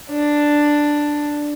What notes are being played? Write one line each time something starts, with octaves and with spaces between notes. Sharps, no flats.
D4